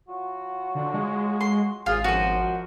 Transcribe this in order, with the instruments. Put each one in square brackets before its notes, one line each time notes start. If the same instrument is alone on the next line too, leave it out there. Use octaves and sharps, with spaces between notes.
[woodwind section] F#3 F4 F#4
[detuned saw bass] D3
G#3
[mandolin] C6
[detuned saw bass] G#1 [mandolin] F4 [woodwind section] G#4
[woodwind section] F#2 F3 [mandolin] F#4 D#5